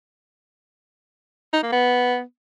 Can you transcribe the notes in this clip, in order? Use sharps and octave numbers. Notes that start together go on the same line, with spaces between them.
D#4
A#3
B3